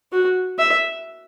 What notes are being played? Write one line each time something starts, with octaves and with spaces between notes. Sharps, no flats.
F#4
E5